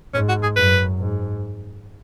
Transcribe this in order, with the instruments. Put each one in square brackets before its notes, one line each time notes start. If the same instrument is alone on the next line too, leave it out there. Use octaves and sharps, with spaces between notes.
[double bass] G#2 [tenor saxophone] C#4
[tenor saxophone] F#4
G#4
[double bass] F#2 [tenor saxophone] B4
[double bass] G#2